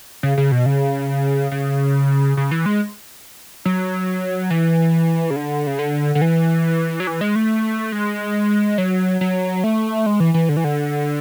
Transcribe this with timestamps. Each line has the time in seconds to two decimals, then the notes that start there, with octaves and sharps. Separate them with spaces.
0.23 C#3
0.38 C#3
0.52 B2
0.66 C#3
1.52 C#3
2.37 C#3
2.51 E3
2.66 G#3
3.65 F#3
4.50 E3
5.30 C#3
5.36 D3
5.67 C#3
5.79 D3
6.15 D3
6.21 E3
7.00 F#3
7.07 E3
7.21 G#3
7.35 A3
7.92 G#3
8.78 F#3
9.21 F#3
9.64 A3
10.06 G#3
10.20 E3
10.34 E3
10.49 D3
10.57 E3
10.64 D3